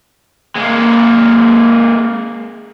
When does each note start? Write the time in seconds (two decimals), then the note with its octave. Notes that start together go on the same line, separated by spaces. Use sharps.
0.56 G#3 A#3